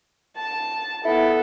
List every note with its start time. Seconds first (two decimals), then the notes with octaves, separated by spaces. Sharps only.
0.37 A5
1.05 B3 E4 A4